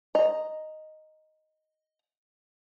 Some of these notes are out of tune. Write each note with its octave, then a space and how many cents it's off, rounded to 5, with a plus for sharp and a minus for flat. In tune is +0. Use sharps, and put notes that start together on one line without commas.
D#5 +0 A#5 +0